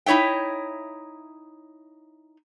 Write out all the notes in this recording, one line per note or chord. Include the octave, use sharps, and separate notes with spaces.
D#4 E4 C#5 E5 G5